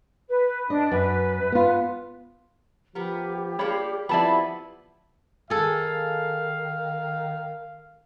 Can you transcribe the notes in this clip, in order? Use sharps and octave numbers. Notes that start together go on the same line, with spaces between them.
B4
D4 D#5
F#2 B4
B3 F4
F3 B3 G4 A#4
A#3 D4 F4 G#4 C#5 B5
F3 B3 C4 E4 D5 A5 B5
D#3 G#4 A4 F5